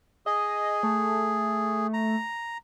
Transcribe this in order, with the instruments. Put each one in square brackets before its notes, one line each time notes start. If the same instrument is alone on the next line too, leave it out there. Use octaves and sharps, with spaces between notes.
[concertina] G#4 [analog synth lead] D#5
[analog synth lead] A3
[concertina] A#5